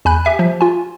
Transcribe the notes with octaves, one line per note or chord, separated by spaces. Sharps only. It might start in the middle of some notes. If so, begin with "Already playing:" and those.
E2 G#5 B5 F#6
G4 E5 G#5
F3
F4 G#5